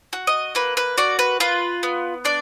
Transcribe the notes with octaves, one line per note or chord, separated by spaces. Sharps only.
F#4
D#5
A#3 B4
B4
F#4 D5
B4
F4 B4
B3
D4 D5